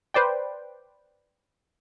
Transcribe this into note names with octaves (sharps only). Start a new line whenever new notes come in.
B4 C5 D5 G5